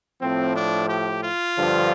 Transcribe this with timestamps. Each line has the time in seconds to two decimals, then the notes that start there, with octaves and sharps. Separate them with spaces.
0.21 A2 F3 C4
0.55 D4
0.89 G4
1.23 F4
1.57 G2 D3 F3